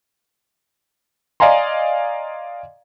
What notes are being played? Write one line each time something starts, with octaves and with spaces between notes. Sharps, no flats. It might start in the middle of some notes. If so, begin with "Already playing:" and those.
D5 D#5 F5 G#5 A#5 C6